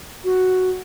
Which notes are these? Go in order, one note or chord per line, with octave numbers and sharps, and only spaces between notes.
F#4